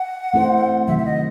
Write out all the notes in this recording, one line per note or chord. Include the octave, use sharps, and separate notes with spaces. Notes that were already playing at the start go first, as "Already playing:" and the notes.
Already playing: F#5
A3 C4 E4 A4 C5
C3 D#3 F#3 E5
E5
D#5